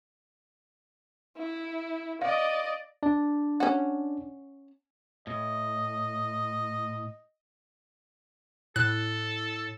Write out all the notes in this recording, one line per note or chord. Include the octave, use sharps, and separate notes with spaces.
E4
D5 D#5 F5
D4 D5
C#4 F#4
A2 D#5
A2 A4 F#6